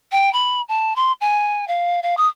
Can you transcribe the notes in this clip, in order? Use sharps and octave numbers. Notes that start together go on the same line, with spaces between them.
G5
B5
A5
C6
G#5
F5
F5
D#6